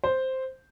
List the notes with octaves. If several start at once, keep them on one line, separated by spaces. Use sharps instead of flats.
C5